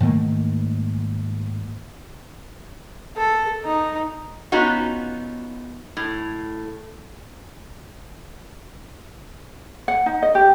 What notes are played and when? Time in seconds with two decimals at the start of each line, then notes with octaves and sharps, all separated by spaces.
0.01 G#2 D#3 A3 A#3
3.17 A4
3.64 D#4
4.52 B3 C#4 D#4 F4 F#4
5.97 A2
9.88 F#5
10.06 D#4
10.23 D#5
10.35 G4